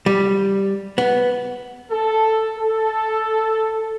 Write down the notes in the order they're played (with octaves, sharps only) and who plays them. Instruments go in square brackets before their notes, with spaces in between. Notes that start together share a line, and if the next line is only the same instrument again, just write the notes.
[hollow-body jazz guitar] G3
B3
[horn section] A4
A4